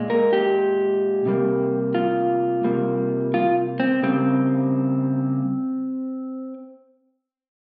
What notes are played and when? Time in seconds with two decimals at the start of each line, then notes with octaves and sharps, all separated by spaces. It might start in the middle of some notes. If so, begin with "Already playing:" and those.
Already playing: A#2 G#3
0.10 A#4
0.33 G4
1.26 C3 G3 A#3
1.95 F4
2.64 C3 G3 A#3
3.34 F4
3.80 C4
4.03 C#3 G3 A#3 C4